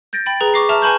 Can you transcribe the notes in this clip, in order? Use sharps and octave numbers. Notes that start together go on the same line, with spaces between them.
G6 A6 A#6 D7
G5 B5 A6 D7
G#4 B4 A#5
C#6 D6 A#6 C7
E5 A5 A#5 F6
B4 G#5 A5 B5 C#6 G6